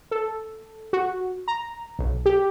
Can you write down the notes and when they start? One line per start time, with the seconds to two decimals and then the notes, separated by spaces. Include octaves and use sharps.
0.11 A4
0.93 F#4
1.48 A#5
1.99 B1
2.26 G4